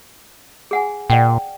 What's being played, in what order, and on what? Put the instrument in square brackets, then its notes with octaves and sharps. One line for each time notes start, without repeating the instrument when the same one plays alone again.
[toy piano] G#4 F#5 G#5
[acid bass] A#2 [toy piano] D5 F#5 G5